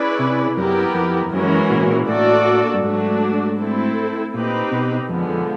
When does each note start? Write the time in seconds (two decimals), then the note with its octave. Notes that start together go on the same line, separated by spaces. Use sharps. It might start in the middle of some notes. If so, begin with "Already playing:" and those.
Already playing: C#4 E4 G#4 B4 D5
0.19 C3
0.57 F#2 B3 E4 G4 A#4
0.94 F2
1.25 F2
1.32 F#2 E3 G#3 C#4 F#4 A#4
1.70 A#2
1.78 A2
1.87 A#2
2.08 A2 A#3 D4 F#4 A4 D5
2.74 G2
2.84 G#2 F#3 A3 D4 F#4
3.59 A3 C4 E4 A4
4.34 A#2 C4 D#4 G4 B4
4.72 B2
5.09 F2 D3 F3 G#3 B3
5.29 F2